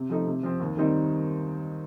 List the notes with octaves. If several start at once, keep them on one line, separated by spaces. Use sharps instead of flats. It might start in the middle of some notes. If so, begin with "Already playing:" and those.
Already playing: C3
F3 A3 D#4
C3
F3 C4
D#2
D#3 G3 C4 D#4